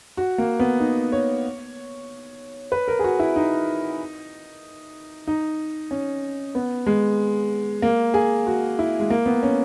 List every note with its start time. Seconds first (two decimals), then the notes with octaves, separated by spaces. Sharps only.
0.17 F#4
0.38 A#3
0.60 B3
0.80 D#4
1.12 C#5
2.72 B4
2.88 A#4
2.99 G#4
3.04 F#4
3.19 E4
3.36 D#4
5.27 D#4
5.91 C#4
6.55 B3
6.86 G#3
7.82 A#3
8.14 G#4
8.47 F#4
8.79 E4
9.00 G#3
9.10 A#3
9.26 B3
9.43 C#4